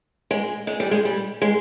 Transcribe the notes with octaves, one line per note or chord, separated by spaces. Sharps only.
G#3
G#3
G3
G#3
G3
G#3